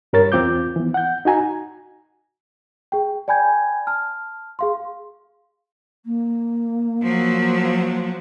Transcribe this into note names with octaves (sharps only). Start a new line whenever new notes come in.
G2 G3 A#4 C#5 A6
E2 C4 F4 D6 G6
E3 B3
F#5 G6
D#4 F#4 G#5 A#5
G#4 G5
D5 G5 G#5 B5 G6 G#6
A5 F6
G#4 F5 C6
A#3
F3 F#3